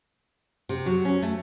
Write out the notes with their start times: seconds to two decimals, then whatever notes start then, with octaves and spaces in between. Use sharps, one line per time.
0.69 C3
0.86 F#3
1.05 C#4
1.22 A3